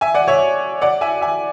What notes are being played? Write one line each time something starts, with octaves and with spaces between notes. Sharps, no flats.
E5 G#5
D5 F#5
C#5 E5
D5 F#5
E5 G#5
E5 G#5